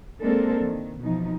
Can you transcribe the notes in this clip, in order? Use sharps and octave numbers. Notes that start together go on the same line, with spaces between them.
G#3 A#3 C4 D4 A4 A#4
D#3
B2 E3 F3 D#4